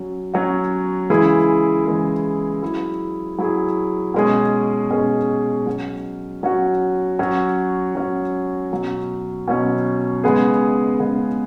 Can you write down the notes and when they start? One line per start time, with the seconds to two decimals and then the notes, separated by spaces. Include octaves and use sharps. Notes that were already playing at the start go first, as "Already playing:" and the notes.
Already playing: F#3 C#4 F#4
0.34 F#3 C#4 F#4
1.10 C#3 E3 G#3 E4 G#4
1.86 C#3 E3 G#3 E4 G#4
2.63 F#3 E4 G#4
3.38 F#3 E4 G#4
4.14 B2 G#3 C#4 G#4
4.90 B2 G#3 C#4 G#4
5.66 F#3 C#4 F#4
6.43 F#3 C#4 F#4
7.19 F#3 C#4 F#4
7.95 F#3 C#4 F#4
8.71 B2 F#3 C#4
9.48 B2 F#3 C#4
10.24 C#3 G#3 B3 G#4
11.00 C#3 G#3 B3 G#4